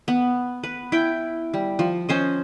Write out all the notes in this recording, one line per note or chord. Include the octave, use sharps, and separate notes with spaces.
B3
B4
E4 G5
G3
F3
C#4 C5 D#5